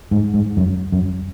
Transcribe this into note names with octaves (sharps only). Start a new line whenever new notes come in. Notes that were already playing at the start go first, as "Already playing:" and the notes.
G#2
G#2
F#2
F#2